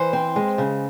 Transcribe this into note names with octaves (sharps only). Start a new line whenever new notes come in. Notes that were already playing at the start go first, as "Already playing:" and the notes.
Already playing: E3 C5
C4
G#3
C#3